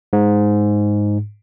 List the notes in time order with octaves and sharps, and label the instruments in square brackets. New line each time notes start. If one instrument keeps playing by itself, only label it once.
[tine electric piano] G#2